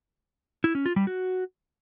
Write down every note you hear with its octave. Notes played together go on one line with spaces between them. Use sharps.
E4
C#4
F4
G3
F#4